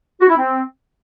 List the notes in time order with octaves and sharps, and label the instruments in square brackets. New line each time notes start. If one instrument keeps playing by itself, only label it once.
[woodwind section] F#4
E4
C4